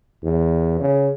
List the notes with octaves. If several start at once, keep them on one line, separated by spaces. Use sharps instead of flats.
E2
C#3